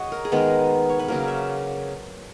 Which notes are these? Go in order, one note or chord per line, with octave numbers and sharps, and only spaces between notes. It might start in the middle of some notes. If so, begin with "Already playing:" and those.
Already playing: C#3 F#4 C#5 D#5
A#4
G#4
D#3 G#3 B3 A#4
C#5
B4
C#3 F#3 A#3 A#4
E5